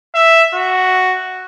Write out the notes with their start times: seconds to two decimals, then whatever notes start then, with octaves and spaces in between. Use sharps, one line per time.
0.15 E5
0.54 F#4